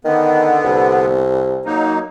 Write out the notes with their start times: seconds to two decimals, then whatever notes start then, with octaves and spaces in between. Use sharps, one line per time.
0.05 D3 D#3 B3
0.65 C2
1.65 F#3 A#3 D#4